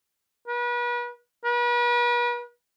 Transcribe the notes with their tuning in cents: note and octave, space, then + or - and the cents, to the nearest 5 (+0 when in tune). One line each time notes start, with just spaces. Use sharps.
B4 -35
B4 -40